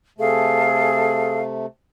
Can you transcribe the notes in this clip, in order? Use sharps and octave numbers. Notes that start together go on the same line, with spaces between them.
C3 A3 G#4 A4 F5